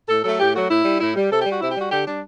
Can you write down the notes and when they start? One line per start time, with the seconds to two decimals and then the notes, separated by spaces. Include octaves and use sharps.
0.09 A2 A4
0.24 F#3 A3 A4
0.39 A2 G4
0.54 F#3 A3 F#4
0.70 A2 E4
0.85 G3
1.00 A2 E4
1.15 G3
1.31 C3 A4
1.40 G3 G4
1.50 F#4
1.61 C3 E4
1.71 G3 G4
1.81 F#4
1.91 D3 G4
2.06 G3 D4